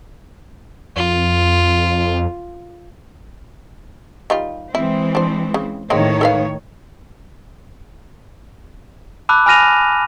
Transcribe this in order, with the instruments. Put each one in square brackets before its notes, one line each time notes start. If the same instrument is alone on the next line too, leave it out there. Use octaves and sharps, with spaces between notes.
[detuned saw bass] F2 [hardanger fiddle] F4
[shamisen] D#3 G3 F4
[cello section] E3 G#3 C4 [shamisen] E4
[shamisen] D4 C5
C#3
[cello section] A2 D#3 C#5 [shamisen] G#3 A#3 C4
[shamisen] A4 B4 F5
[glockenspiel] A5 B5 D6 E6 F#6
G#5 B5 F6 A#6 D#7 F7